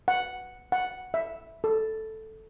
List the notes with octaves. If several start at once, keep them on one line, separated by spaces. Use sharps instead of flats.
F#5
F#5
E5
A4